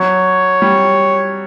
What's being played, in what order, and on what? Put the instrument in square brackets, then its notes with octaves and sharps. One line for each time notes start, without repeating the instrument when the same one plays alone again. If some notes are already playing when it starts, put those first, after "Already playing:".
Already playing: [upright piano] F#3 [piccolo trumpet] C#5
[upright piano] G3